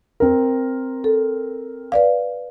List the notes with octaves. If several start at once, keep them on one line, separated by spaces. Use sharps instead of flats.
C4 A#4
A4
B4 D5 F5